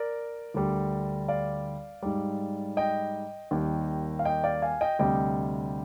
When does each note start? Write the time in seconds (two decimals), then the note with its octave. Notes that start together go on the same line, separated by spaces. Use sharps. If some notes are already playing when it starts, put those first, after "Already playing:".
Already playing: A#4 D5
0.54 D2 D3 G3
1.28 D5 F5
2.03 G#2 G3
2.77 D#5 G5
3.51 D#2 D#3 G3
4.19 F5
4.25 D#5 G5
4.44 D5 F5
4.62 F5 G#5
4.81 D#5 G5
4.99 D2 C3 G3 D#5 G5